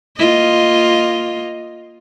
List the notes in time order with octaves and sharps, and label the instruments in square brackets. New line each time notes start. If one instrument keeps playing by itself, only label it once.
[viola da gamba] A#3 F4 D#5